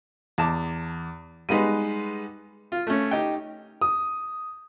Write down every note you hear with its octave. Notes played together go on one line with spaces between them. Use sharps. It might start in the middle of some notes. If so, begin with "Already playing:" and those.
E2 A5 D6
G3 G#3 B3 D#4 B4 D#7
F4
A3 C#4
D#4 G4 G5
D#6